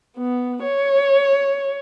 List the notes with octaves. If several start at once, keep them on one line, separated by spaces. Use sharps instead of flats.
B3
C#5